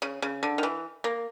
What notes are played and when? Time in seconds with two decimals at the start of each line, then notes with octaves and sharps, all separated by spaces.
0.02 C#3
0.22 C#3
0.43 D3
0.58 D#3
0.63 E3
1.04 A#3